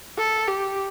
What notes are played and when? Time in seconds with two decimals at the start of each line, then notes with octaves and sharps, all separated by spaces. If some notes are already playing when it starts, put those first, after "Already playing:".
0.18 A4
0.48 G4